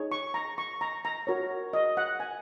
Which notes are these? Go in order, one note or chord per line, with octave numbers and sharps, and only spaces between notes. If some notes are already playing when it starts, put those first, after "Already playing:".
Already playing: D#4 G#4 C#5
C#6
A#5
C#6
A#5
A#5
F#4 A#4 C#5
D#5
F#5
G#5